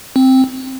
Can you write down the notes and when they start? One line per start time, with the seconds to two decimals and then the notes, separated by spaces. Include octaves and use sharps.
0.16 C4